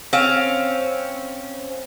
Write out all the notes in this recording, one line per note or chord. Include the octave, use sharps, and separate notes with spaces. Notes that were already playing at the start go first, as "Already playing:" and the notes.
C4 C#4 F5